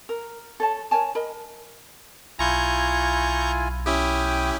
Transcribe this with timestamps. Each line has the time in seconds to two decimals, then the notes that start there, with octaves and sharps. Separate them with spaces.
0.09 A#4
0.60 A4 C#5 A5
0.91 A#4 C#5 G#5 A5
1.15 A#4 D#5 B5
2.39 B1 E4 F4 G#5 A#5 C#6 G6
3.86 C#4 E4 G4 G5 D#6